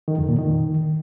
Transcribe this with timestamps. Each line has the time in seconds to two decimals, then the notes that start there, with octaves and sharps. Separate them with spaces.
0.08 D#3
0.18 F2
0.29 A#2
0.39 D#3